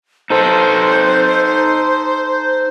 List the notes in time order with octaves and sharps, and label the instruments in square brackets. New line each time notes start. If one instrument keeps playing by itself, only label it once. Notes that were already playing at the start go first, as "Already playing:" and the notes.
[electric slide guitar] D#4 A4 [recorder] C5